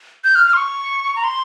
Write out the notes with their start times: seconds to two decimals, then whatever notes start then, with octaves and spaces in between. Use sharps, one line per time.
0.24 G6
0.35 F6
0.46 F6
0.53 C6
0.57 C#6
1.16 A#5
1.24 C6